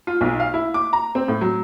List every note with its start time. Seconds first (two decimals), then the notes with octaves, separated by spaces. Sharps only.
0.07 F4
0.21 B1
0.40 F5
0.54 E4
0.74 D6
0.93 A#5
1.15 C4
1.28 A2
1.41 F#3